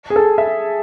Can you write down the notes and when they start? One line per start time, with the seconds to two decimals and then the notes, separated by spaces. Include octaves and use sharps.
0.10 G#4
0.16 A4
0.38 E5